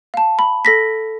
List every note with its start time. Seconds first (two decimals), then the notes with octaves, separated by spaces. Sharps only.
0.14 F5 A5
0.39 B5
0.65 A4 A#6 B6